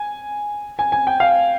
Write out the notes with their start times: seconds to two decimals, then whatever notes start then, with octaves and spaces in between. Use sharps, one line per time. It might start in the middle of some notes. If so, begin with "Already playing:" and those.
Already playing: G#5
0.79 G#5
0.92 G#5
1.07 G5
1.20 F5